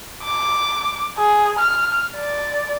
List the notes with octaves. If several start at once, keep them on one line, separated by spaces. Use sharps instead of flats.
D6
G#4
F6
D5